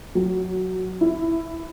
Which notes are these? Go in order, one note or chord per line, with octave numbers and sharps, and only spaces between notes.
F#3
E4